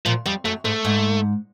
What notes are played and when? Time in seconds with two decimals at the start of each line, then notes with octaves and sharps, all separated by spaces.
0.06 A#2 F3
0.26 F2 G3
0.45 F#2 A3
0.65 G#2 A3
0.85 G#2